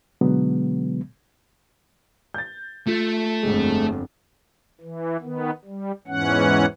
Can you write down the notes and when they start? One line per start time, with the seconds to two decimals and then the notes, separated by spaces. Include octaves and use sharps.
0.21 B2 D3 F#3 G#3 B3
2.34 G6 A6
2.87 A3 F4
3.43 G1 F2 G#3
4.81 E3
5.22 D#3 B3
5.65 G3
6.08 E2 G#2 E3 C#4 F#5